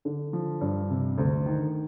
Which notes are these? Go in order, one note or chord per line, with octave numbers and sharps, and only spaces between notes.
D3
F3
G2
C3
D2
D#3